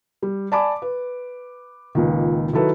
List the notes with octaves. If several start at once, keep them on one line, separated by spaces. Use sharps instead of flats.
G3
D5 G#5 A5 B5 D6
B4
C#2 A#2 D#3
D#3 F#3 E4 A4 B4